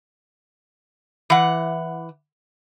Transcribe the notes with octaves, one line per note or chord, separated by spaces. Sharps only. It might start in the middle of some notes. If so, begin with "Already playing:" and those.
E3 F#5